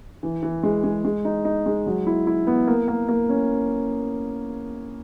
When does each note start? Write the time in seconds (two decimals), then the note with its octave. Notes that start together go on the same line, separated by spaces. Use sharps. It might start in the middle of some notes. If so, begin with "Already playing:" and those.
0.23 E3
0.43 E3
0.63 G#3
0.84 G#3
1.05 G#3
1.25 D#4
1.45 D#4
1.66 G#3
1.86 F#3
2.07 E4
2.27 E4
2.47 B3
2.68 A#3
2.88 A#3
3.09 A#3
3.29 C#4